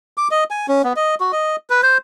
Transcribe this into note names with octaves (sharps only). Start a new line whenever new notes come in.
D6
D#5
G#5
C#4
B3
D#5
F#4
D#5
B4
C5